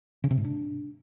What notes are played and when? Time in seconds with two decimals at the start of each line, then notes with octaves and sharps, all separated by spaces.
0.24 C#3
0.31 C3
0.38 G#2
0.44 D4